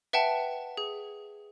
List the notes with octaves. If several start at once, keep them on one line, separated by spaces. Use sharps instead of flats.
B4 E5 F#5 G5 A5
G#4